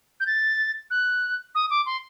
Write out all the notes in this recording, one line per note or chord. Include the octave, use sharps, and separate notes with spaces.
G6
A6
F#6
D#6
D6
C6